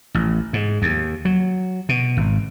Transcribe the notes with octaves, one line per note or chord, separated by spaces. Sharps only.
A1
G#2
D#2
F#3
B2
G#1